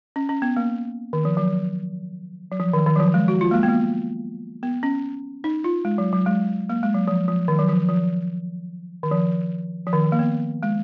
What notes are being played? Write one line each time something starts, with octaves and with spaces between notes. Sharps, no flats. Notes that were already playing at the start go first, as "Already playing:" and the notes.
C#4
C#4
B3
A#3
D#3
F3
F#3
F#3
F3
D#3
D#3
F#3
F3
G#3
F#4
F4
A#3
G#3
B3
A#3
B3
C#4
D#4
F4
G#3
F#3
F#3
G#3
A#3
G#3
F#3
F3
F3
D#3
F#3
F3
F3
D#3
F3
F3
D#3
A#3
B3
G#3